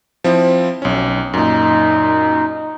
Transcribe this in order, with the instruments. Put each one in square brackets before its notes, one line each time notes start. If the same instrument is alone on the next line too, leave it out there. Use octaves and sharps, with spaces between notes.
[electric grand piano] F3 C4 E4
B1 C#4
[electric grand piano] F#2 A#2 [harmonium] D#4